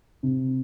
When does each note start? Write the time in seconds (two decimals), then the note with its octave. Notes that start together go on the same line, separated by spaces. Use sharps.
0.23 C3